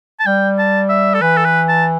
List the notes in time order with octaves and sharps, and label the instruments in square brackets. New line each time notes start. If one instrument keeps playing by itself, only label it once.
[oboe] A5
[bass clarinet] G3 [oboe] G5
[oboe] A5
E5
A4
[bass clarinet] E3 [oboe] B4
[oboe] A4
B4
A5